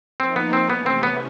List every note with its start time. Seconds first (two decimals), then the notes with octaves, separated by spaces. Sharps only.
0.20 F3 A#3 C4 D#4
0.36 B3
0.53 C4
0.70 C3 E3 A3 B3 C#4
0.86 C4
1.03 B3